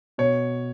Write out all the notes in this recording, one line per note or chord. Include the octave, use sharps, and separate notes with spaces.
B2 C#5